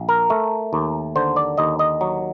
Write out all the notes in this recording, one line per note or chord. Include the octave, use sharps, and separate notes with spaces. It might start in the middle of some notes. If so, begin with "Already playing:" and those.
Already playing: A#1
A#4
A3
D#2
D3 C5
D5
D#2 D#5
D#5
F#3